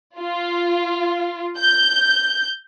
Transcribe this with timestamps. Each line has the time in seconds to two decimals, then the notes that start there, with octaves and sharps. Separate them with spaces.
0.18 F4
1.58 G6